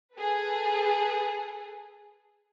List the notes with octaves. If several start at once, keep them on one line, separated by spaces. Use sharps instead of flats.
G#4 A4 B4